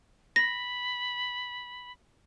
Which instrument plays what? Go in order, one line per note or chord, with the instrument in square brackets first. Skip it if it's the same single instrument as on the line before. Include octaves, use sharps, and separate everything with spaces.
[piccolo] B5 [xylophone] A#6